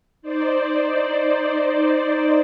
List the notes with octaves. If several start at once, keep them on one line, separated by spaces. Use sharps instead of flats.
D#4 C5 D5